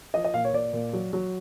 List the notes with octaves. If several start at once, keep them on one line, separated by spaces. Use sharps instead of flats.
F3 D#5
D#5
A#2 F5
C#5
A#2 D5
A#2
F#3
F#3